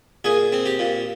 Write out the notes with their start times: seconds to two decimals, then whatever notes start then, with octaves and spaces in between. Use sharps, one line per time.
0.24 A#2 G#4
0.52 C4
0.66 G4
0.79 A#2